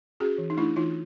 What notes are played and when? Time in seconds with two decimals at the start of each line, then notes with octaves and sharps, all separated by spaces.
0.20 C#4 F#4 G#4
0.38 E3
0.50 D#4
0.57 A3 D4 E4
0.76 E3 D#4 F4